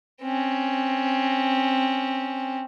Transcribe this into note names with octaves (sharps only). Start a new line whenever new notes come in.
C4 C#4